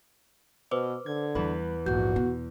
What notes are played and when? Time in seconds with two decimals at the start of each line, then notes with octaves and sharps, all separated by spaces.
0.71 B2 B4 C5 D6
1.06 D3 G#6
1.35 E2 G3 B4 B5
1.86 A#1 G#2 F#4 G6
2.16 B2